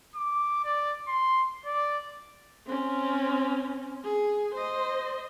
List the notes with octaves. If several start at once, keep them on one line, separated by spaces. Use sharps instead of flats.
D6
D5
C6
D5
C4 C#4
G#4
C5 D#5